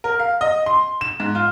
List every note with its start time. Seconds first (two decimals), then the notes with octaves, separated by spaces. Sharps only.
0.04 A#4
0.19 F5
0.41 D#5
0.66 C6
1.01 E7
1.20 G#2
1.35 F4